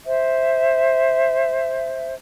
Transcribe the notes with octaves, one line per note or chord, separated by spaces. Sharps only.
C5 E5